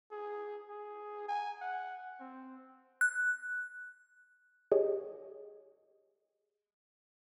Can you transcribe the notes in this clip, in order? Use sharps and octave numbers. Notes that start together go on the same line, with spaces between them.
G#4
G#4
G#5
F#5
C4
F#6
G4 G#4 C#5 D#5